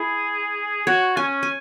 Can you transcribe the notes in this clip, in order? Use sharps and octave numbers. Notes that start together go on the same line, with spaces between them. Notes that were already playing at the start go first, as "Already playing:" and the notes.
Already playing: E4 G#4
F#4 C#5
C#4 G#5
G#5